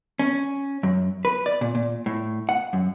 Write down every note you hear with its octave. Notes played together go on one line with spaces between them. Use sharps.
C#4
F#2
B4
D5
A#2
A#2
A2
F#5
F#2